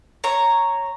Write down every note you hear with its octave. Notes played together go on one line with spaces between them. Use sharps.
C#5 A#5